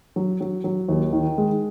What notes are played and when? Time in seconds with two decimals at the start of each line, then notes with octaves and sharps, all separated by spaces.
0.16 F#3
0.41 F#3
0.64 F#3
0.88 D#2
1.13 D#3
1.38 G#3